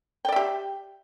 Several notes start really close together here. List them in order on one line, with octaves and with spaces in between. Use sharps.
G5 D5 E5 G4